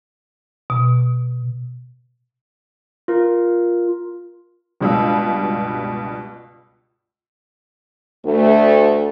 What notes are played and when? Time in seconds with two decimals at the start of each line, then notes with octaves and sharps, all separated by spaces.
0.70 B2
3.08 F4 A#4
4.81 C#2 G2 B2 G3 F5 E6
8.25 D2 A3